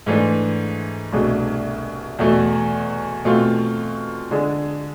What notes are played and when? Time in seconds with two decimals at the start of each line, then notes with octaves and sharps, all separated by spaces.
0.06 G#2 E3 A3 D4
1.12 C2 B2 A3 D4 G#4
2.19 E2 B2 A3
3.25 B2 A3 C4 F4
4.31 D3 G#3 D4 G#4